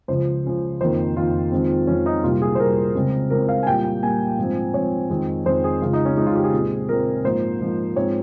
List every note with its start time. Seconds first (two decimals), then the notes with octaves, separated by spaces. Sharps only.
0.08 C#2 C#3 F3 C5
0.44 C#2 C#3 F3
0.81 F2 D#3 A#3 C5
1.16 F2 D#3 A#3 F4
1.52 F2 D#3 G#3 C4
1.87 F2 D#3 G#3 C4 C#4
2.06 D#4
2.24 C2 A#2 G3 A#3 F4
2.42 G#4
2.55 C5
2.59 C2 A#2 G3 A#3 A#4
2.95 C#2 C#3 G#3 C4
3.30 C#2 C#3 G#3 C4 A#4
3.49 F5
3.63 G#5
3.66 A#2 G3 A#3 G5
3.84 G5
4.03 A#2 G3 A#3 G#5
4.39 G#2 F3 C4
4.74 G#2 F3 C4 C#5
5.09 F2 D#3 G#3 C4
5.45 F2 D#3 G#3 C4 C5
5.64 G#4
5.82 C#2 C#3 G#3 F4
5.93 D#4
6.05 C#4
6.17 C#2 C#3 G#3 D#4
6.26 F4
6.36 G4
6.44 G#4
6.53 A#2 G#3 C4
6.89 A#2 G#3 C4 A#4
7.24 G#2 F3 A#3 C5
7.61 G#2 F3 A#3
7.96 G#2 F3 G#3 C4 C#5